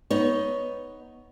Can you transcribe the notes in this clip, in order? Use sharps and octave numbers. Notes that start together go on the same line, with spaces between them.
B3 D#4 C#5